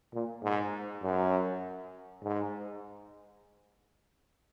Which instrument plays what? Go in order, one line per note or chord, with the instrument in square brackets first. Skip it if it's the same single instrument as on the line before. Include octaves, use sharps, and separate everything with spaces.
[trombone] A#2
G#2
F#2
G#2